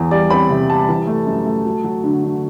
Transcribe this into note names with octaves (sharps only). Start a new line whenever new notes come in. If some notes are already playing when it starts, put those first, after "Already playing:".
Already playing: E2
G3 D5
C4 B5
C3
G3 A5
E3
A3
F#2
A3
F#3
F#3
D3
D3